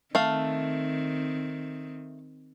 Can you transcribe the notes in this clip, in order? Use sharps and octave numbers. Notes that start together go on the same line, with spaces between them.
D#3 A3 C4 F5